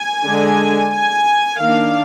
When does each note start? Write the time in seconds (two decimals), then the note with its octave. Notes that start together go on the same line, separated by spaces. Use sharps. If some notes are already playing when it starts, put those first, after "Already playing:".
Already playing: G#5
0.26 D3 G#3 D4
0.92 G#5
1.59 D#3 A#3 D4 F5